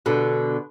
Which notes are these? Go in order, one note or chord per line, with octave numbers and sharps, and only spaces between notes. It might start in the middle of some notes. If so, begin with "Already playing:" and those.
B2 D3